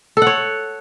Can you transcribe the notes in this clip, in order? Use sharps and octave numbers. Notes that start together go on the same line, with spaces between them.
A4 C#5 F#5